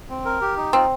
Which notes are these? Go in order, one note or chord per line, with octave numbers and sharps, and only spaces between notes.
C4
A#4
G4
D#4
C4 F4